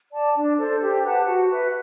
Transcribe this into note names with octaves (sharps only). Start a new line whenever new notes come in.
D5 A5
D4
A4 C5
G4
B4 F#5 A5
F#4
B4 E5